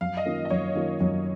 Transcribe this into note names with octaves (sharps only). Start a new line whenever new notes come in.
F#2 F5
D#5
D#3 A#3 C#4 F4
D#5
F#2 C#5
D#3 A#3 C#4 F4
F#2